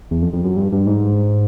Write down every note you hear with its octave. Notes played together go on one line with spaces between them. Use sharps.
E2
F2
F2
F#2
G2
G2
G#2